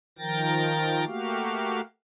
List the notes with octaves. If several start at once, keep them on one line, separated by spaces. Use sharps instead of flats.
D#3 F3 A#4 G5 A6 A#6
A3 A#3 F#4 G4 F5